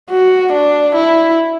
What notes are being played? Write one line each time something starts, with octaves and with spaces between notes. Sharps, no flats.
F#4
D4
E4